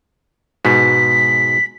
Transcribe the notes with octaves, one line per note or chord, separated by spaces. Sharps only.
G#2 B2 B6